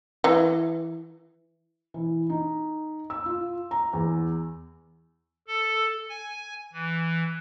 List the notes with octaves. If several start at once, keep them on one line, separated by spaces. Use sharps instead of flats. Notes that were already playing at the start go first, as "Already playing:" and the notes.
E3
E3
D#4
E6
F4
A#5
E2
A4
G#5
E3